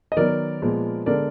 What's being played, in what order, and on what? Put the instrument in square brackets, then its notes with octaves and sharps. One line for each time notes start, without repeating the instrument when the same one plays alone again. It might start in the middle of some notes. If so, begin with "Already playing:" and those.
[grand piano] D#5
D#3 F#3 B3 A#4 D5
A#2 F3 G#3 B3
D3 G#3 B3 A#4 D5